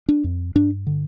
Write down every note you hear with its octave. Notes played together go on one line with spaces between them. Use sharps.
D4
F2
G2 D4
D3